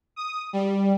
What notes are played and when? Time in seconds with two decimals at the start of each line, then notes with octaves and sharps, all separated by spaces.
0.16 D#6
0.53 G3